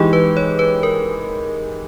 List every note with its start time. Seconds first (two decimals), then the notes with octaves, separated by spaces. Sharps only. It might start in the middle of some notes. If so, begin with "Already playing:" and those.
Already playing: E3 G#3 D#4 G4 G#4
0.13 B4
0.37 C#5
0.59 B4
0.83 A#4